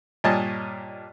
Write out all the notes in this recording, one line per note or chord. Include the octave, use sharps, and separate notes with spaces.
G2 A#2 C#5 D#5 G#5 A5